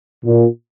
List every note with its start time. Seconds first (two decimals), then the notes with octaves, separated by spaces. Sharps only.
0.24 A#2